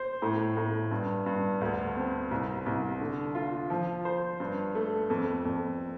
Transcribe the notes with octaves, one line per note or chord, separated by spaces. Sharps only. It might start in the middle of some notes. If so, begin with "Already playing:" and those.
Already playing: C5
A2
A2
G2
G2
D2
C4
C2
C2
D3
F4
F3
C5
G2
A3
F2
F2